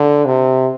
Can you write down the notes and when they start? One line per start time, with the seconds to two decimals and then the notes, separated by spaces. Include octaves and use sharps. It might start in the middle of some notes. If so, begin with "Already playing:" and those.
Already playing: D3
0.26 C3